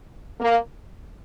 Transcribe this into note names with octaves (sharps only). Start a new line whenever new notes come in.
A#3